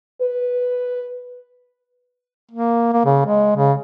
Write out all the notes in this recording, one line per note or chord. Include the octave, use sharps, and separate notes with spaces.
B4
A#3
A#3
C#3
G#3
C#3